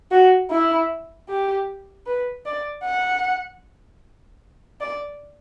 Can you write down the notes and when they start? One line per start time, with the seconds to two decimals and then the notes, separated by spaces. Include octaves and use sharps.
0.11 F#4
0.51 E4
1.29 G4
2.07 B4
2.46 D5
2.85 F#5
4.81 D5